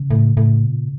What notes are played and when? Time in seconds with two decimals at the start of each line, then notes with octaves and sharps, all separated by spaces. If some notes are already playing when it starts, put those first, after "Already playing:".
Already playing: C#3
0.11 A2
0.37 A2
0.64 A#2